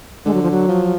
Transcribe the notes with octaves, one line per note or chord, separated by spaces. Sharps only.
D3 G#3
F#3
F3
F#3
F3